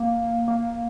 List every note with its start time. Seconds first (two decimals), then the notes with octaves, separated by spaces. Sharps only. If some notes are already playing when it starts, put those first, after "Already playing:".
Already playing: A#3
0.48 A#3